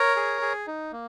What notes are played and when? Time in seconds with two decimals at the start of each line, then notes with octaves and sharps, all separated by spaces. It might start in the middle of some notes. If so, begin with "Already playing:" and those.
Already playing: A#4 C#5
0.16 G#4
0.41 G#4
0.67 D#4
0.92 A#3